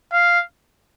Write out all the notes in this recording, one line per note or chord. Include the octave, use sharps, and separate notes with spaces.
F5